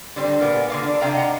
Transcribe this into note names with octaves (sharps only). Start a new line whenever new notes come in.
D3 G3 C4
A#2 B3 A#4
D3 A#3 F5
D4
C3 D4 F5 G5 A#5
D#5 F#5 A#5